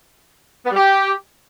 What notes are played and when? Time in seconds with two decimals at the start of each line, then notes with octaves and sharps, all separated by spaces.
0.65 B3
0.70 G3
0.76 G4